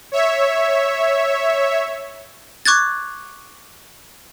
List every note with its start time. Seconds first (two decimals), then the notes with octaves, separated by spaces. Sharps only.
0.12 C#5 E5
2.65 C#6 D6 F#6 G#6 A6